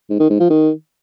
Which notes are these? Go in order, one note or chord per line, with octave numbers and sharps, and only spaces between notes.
G#2
D#3
G#2
F3
D#3